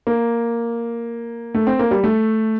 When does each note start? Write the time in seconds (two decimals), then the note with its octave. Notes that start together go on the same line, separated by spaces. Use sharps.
0.07 A#3
1.55 A3
1.67 C4
1.79 A#3
1.91 G3
2.04 A3